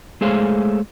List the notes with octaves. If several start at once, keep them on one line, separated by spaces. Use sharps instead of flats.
G#3 A3 G#4 C5 C#5 F5